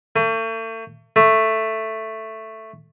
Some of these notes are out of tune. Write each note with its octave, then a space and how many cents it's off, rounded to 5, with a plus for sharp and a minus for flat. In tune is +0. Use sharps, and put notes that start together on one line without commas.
A3 +40
A3 +5